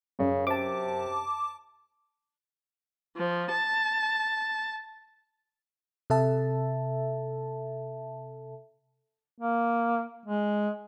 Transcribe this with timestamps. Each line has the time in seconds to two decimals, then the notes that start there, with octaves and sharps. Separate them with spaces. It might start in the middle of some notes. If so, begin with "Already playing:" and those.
0.19 F#2 C#3
0.47 C3 A5 D6
3.17 F3
3.52 A5
6.10 C3 A4 E5 A5
9.39 A#3
10.26 G#3